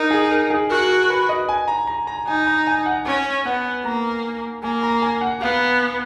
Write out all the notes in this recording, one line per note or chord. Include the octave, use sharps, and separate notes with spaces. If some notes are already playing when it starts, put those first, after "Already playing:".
Already playing: D#4 A#4
G#4
A#4
G#4
F#4 A#4
A#4
B4
D#5
G#5
A#5
A#5
A#5
D#4 G#5
A#5
G#5
F#5
C#4 G#5
B3 F#5
A#3 A#5
A#3 G#5
A#5
G#5
F#5
B3 F5